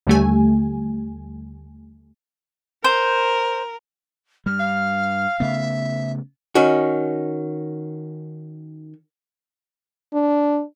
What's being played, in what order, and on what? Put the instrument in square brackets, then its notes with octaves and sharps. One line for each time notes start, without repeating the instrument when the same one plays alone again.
[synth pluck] D#2 D3 G3 A3 G4 G#5
[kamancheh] A#4 [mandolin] C5
[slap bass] G2 G3 [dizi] F6
[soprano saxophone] F5
[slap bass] C#3 A3 B3 [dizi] E5
[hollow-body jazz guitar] D#3 C#4 F#4
[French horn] D4